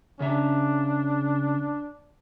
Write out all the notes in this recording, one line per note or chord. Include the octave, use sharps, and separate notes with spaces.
C#3 D4 E5 A#5